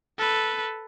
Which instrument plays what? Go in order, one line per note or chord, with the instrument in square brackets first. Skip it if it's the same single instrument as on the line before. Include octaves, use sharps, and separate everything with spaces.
[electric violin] A4 B4